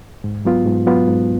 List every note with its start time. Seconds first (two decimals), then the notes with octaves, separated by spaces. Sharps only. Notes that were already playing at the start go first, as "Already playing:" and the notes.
0.24 G#2
0.45 F#3 B3 F4
0.66 G#2
0.86 F#3 B3 F4
1.08 G#2